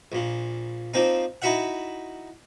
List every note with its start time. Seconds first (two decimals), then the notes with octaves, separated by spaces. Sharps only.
0.12 A#1 A#2
0.94 F3 A#3 C4 D#4
1.42 D#4 E4 F#4 E5 F#5